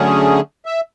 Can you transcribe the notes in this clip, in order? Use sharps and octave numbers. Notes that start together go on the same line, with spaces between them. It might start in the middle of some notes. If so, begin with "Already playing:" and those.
Already playing: D3 F#3 A3 C#4 G#4
E5